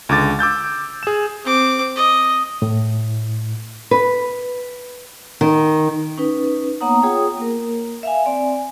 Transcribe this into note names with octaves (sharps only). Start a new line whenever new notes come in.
C#2 D3 D6 A6
D6 E6 G6 A6
G#4 E7
C4 D6
D#5
A2
B4
D#3
C#4 D#4 B4
A#3 B3 C#5 F#5 A#5 D#6
F4 G#4 C#5 G5 D#6
A#3 A#4
E5 F5 G#5
C4 D5 G#5